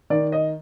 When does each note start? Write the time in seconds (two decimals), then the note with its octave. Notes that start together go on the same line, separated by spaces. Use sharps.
0.10 D#3 D5
0.32 D#5